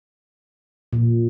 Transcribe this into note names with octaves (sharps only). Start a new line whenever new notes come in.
A#2